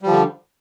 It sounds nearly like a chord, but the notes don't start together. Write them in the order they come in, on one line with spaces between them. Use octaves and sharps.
G3 F3 D3